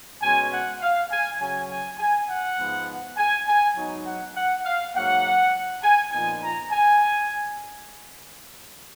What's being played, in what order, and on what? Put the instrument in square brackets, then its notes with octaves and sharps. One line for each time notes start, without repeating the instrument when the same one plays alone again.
[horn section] B2 G#3 C#4 G#5
F#5
F5
G#5
C#3 F#3 C#4 G#5
G#5
G#5
F#5
G#2 F3 B3
G#5
G#5
G#2 F#3 B3 D#4
F#5
F#5
F5
G#2 F#3 A#3 F#5
G#5
A#2 F3 B3 D#4 G#5
A#5
G#5